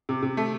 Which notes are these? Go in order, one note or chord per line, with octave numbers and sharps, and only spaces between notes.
C3
C3
A3